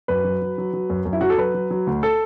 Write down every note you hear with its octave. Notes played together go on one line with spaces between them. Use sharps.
F#2 B4
F#3
F#3
F#3
F#3
F#2
F#2
E4
F#3 F#4
A4
F#3 B4
F#3
F#3
D2
A4